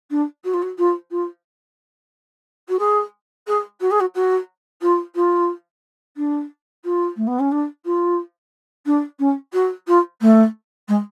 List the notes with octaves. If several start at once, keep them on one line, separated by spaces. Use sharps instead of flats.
D4
F#4
F4
F#4
F4
F4
F#4
G#4
G#4
F#4
G#4
F#4
F#4
F4
F4
D4
F4
A3
B3
C#4
D4
F4
D4
C#4
F#4
F4
A3
G#3